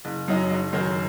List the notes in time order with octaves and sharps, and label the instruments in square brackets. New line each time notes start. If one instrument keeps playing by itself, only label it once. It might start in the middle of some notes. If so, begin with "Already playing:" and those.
[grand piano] F#1
F#2 F#3 D#4
F#1
F#2 D#3 F#3